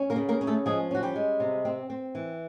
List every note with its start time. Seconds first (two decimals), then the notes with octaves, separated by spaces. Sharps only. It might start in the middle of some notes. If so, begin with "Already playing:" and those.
Already playing: C#4
0.10 A#3 A#4
0.16 C#3
0.29 A#3 A#4
0.41 C#4
0.47 A3 A4
0.66 F3 G#3 G#4
0.91 C#4 F#4
1.03 G3 G4
1.16 G#3
1.40 C3
1.65 C4
1.90 C4
2.15 E3